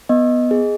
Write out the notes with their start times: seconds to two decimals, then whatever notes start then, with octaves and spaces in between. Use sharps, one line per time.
0.09 B3 D#5
0.51 G#4